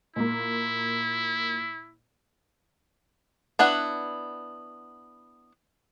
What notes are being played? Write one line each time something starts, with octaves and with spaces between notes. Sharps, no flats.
A#2 A#3 E4
B3 D4 E4 F#5